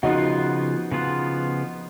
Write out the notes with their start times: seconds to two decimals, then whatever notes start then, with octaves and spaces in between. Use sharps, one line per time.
0.03 C#3 F3 B3 D#4 F4 F#4
0.92 C#3 F3 B3 F4